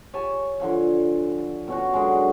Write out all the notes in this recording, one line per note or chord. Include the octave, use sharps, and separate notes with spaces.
G4 C#5 G#5 A5
D3 F3 G#5
B2 C#4 F#4
D3 F#3 G#3 G#4